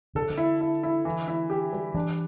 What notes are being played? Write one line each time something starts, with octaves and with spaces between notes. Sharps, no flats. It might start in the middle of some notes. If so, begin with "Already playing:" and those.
D3 A4
C3
D3
E4
E4
E4
E3
E4
G4
G3
E3 D4